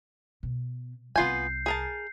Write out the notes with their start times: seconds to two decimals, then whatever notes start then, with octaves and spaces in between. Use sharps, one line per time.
0.43 B2
1.16 C2 B3 E4 F4 G#5 G6 C7
1.66 G#4 A#4 A5